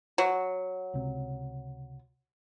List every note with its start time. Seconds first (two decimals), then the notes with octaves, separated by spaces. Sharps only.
0.18 F#3
0.94 C#2 C3